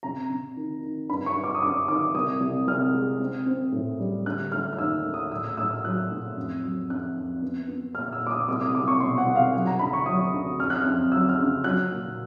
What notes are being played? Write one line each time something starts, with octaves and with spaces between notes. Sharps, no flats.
C3 A#5
C3
D#3
D#3
G2 B5
C#6
G2
D6
D#6
G2 D6
D#3 D6
C2 D#6
C2
C2 F6
G#3
C4
C4
A2
G3
D3 F#6
A3 F6
F6
D#2 E6
A3
D#6
A2 E6
E6
A2 E6
F6
F#3 F#6
A2
F2
F#3
F2 F#6
F2
B3
B3
A#2 F6
E6
A#2
D6
D#6
C2 D6
D#6
C2 D6
C#6
B2 C6
F#5
C2
F5
F#3 F#5
A#5
D2 B5
C#6
F#3 D#6
D2
F2 F6
F#6
F2 F6
F#3 E6
F6
C#3
F#3 F#6
A#2